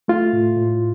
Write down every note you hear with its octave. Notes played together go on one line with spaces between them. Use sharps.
A3 F4
A2
A2